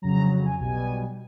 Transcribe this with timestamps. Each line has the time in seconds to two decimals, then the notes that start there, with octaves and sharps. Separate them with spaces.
0.02 F2 C#3 F#3 A#5
0.45 G#5
0.58 B1 B2 G3 G#5